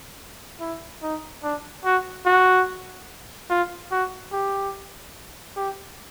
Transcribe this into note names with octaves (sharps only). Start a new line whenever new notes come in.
E4
D#4
D4
F#4
F#4
F4
F#4
G4
G4